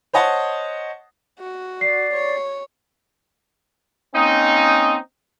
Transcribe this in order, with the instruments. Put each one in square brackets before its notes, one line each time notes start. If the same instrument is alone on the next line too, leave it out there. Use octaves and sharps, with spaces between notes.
[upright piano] C5 C#5 D#5 F#5 A5
[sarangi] F#4
[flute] D5 [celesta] C7
[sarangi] C#5
[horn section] A#3 C4 C#4 D#4